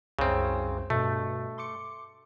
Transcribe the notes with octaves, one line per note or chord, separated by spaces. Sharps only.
C2 F#2 C#3 C4
G2 B2 A3
C6 D6 C#7